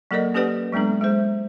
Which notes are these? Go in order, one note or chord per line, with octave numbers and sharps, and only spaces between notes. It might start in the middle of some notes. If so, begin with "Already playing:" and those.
F#3 A#3 A4 A#4 D5 D#5
C#4 G4 A4 B4 D5 F#5
F#3 G#3 B3 D4 A4
G#3 G#4 C5